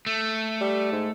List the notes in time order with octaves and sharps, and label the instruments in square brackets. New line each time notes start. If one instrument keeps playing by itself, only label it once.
[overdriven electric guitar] A3
[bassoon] G3
G#2